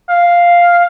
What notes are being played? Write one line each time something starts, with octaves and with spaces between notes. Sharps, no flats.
F5